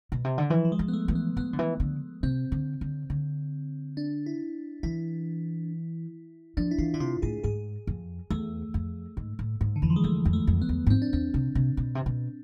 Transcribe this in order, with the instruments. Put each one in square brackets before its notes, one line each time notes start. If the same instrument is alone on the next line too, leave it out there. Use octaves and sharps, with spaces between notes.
[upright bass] B2
C3
D3
[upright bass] E3 [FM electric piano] F3
[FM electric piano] F3
G#3
[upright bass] F3
[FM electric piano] B3
A3
[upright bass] E3
[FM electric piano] B3
[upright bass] F3 [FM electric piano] B3
[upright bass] D3
E3
D3
[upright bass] C3 [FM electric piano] C4
[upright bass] D3
D3
D3
[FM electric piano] D4
E4
[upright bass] E3 [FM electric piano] E4
[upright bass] F3 [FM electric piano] D4
[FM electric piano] E4
[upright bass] E3 [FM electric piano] F4
[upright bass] D3 [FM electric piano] E4
[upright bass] C3 [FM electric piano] F4
[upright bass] A2 [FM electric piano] G#4
[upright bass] G#2 [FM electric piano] G#4
[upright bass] F2
[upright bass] E2 [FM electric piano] A3
[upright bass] F2
G#2
A2
G#2
[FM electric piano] D3
[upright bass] F2 [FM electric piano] E3
[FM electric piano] F3
G#3
[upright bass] E2 [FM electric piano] A3
[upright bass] F2
[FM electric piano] A3
[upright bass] F2
[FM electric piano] B3
[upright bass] E2
G#2
[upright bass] F2 [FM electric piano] C4
[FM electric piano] D4
[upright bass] E2 [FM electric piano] C4
[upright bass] C3
C3
B2
C3
B2